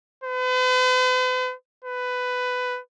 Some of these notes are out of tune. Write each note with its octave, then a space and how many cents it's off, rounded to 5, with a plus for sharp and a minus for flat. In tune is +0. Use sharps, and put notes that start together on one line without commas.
B4 +45
B4 +15